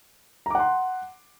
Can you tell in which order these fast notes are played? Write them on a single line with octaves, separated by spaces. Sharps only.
A#5 D6 F#5 C6